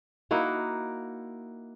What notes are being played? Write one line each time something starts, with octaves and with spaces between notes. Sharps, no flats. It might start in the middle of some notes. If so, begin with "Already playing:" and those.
A#3 D#4 E4 F#4